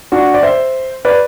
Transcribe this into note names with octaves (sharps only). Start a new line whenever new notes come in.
D4 F#4
D5
C5 E5
B4 D5